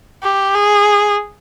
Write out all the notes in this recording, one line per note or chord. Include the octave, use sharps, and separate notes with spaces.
G4
G#4